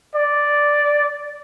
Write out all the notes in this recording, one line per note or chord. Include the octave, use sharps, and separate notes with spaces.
D5